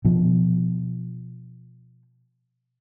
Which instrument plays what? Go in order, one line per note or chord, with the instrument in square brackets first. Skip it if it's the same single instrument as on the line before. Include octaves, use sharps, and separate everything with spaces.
[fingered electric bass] B2 F3